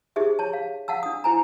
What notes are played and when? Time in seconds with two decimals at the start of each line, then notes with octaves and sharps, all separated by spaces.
0.16 D#4 G4 G#4 C5 E5
0.39 C#5 A5
0.53 F5
0.88 F5 F#5 A5 E6
1.03 D4 D#6
1.24 E4 C5 G#5 A#5